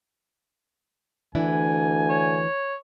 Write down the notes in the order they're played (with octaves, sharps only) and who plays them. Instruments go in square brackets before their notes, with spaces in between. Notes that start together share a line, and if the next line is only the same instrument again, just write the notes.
[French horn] D2 [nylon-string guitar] E3 D4 E4 [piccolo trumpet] G#5
[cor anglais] C#5